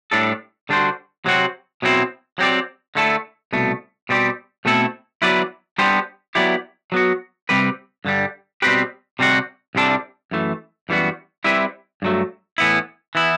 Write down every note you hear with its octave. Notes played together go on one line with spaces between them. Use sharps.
A2 G3 D4 A4
D3 G3 D4 F#4 C5
C3 F#3 C4 F#4
B2 F#3 C4 E4
F#3 C4 G4 D5
D3 A3 E4 A4
C2 B2 A3
B2 G3 C4 G4
B2 A3 C4 E4 A4
F#3 B3 E4 B4 D5
G3 B3 D4 G4 C5
F#3 B3 E4 G4 D5
F#3 B3 F#4
C3 G3 C4 G4 B4
G2 D3 G3
B2 G3 C4 G4 B4
C3 G3 C4 F#4
C2 C3 G3 D4 A4
F#2 E3 A3
F#2 E3 G3 B3 F#4
G3 C4 E4 B4 E5
G2 F#3 A3
A2 E3 B3 E4
E3 B3 E4